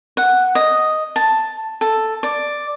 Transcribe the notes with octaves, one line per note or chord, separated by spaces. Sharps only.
F#5
D#5
A5
A4
D5